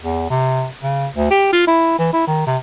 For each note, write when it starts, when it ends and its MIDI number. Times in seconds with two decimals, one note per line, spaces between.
0.03 0.30 40
0.30 0.66 48
0.83 1.07 49
1.16 1.30 38
1.31 1.49 67
1.53 1.65 65
1.67 1.98 64
1.99 2.11 52
2.13 2.26 64
2.28 2.47 51
2.47 2.57 48